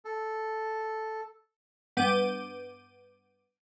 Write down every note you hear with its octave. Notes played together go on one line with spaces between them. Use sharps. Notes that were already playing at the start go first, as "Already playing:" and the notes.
A4
G2 B3 D6 G6 D#7